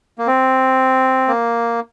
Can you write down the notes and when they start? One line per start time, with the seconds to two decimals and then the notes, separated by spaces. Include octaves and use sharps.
0.18 A#3
0.27 C4
1.28 A#3